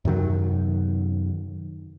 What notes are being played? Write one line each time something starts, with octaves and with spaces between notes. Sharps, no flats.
F#2 C3 D#3 F#3